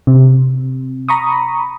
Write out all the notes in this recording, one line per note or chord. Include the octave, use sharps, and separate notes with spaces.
C3
A#5 B5 C#6 D#6